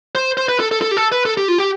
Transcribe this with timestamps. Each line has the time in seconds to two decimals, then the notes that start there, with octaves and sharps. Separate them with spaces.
0.15 C5
0.37 C5
0.48 B4
0.60 A4
0.71 A4
0.82 A4
0.91 G4
0.97 A4
1.12 B4
1.25 A4
1.37 G4
1.48 F4
1.58 G4